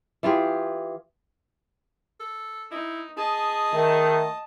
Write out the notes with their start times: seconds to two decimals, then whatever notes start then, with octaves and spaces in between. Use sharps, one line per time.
0.23 E3 F4 G4 G#4
2.20 A4
2.71 D#4 E4
3.17 G#4 D#5 A5
3.73 D#3 A3